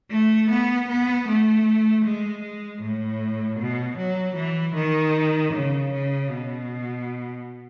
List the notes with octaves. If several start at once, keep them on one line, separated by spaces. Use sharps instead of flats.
A3
B3
B3
A3
G#3
G#3
A2
B2
F#3
E3
D#3
C#3
C#3
B2